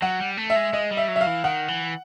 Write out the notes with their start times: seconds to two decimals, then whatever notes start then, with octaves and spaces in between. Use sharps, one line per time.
0.02 F#3 F#5
0.20 G3
0.37 A3
0.50 E5
0.56 G#3
0.73 G#3 D#5
0.91 G3
0.97 E5
1.08 F#3
1.16 E5
1.21 F5
1.27 E3
1.44 D#3 F#5
1.68 E3